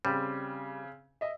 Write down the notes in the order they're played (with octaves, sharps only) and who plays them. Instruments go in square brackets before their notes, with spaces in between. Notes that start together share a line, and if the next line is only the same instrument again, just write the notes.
[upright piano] C#3 C4 [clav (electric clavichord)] G3
[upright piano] D#5 E5